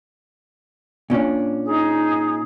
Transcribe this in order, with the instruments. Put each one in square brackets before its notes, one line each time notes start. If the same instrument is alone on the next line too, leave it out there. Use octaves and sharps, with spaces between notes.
[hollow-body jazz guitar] A#2 C#4 D4
[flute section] D#4 G#4